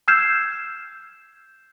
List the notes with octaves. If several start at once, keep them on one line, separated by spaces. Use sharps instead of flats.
E6 F6 G6 G#6 C7 E7